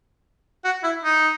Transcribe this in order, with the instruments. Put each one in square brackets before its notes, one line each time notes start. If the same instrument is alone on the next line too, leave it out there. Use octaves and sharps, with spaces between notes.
[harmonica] F#4
E4
D#4